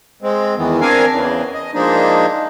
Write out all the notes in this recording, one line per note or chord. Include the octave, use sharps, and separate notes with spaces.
G#3 C4
E2 D#3 E3 B3
C4 D4 A#4 F5 G#5
E2 C#3 E3
D#5
F3 G#3 A#3 D4 D#4